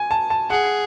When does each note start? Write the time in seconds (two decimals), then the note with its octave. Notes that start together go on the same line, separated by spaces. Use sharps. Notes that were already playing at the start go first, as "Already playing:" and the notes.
Already playing: G#5
0.11 A5
0.30 A5
0.50 G#4 F#5